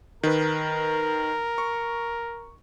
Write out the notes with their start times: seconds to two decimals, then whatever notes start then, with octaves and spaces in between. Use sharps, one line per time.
0.23 D#3 A#4 B4
1.58 C#6